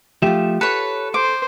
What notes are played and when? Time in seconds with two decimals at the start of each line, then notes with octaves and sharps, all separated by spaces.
0.22 F3 A3 F4 G4 E5
0.61 A4 B4 C#5
1.14 C5 D6